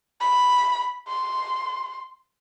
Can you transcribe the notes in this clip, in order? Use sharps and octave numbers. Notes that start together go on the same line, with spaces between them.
B5
C6